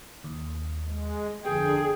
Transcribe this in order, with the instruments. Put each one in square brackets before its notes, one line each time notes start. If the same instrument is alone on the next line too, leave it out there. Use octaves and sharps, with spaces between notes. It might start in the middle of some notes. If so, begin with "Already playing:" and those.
[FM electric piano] D#2
[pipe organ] G#3
[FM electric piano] G1 F2 B3 [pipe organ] D3 [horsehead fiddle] G#4 [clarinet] G5